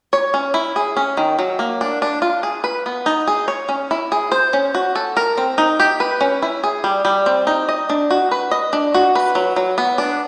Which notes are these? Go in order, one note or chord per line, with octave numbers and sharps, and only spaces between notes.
C#5
C#4
E4
G#4
C#4
D#3
F#3
A#3
D4
D4
F4
G#4
B4
B3
D#4
G#4
C#5
C#4
E4
G#4
C5
C#4
F#4
A4
A#4
C4
D#4
G4
B4
C#4
E4
G#4
G3
G3
C4
D#4
D#5
D4
F#4
B4
D#5
D4
F#4
B4
F#3
F#3
B3
D4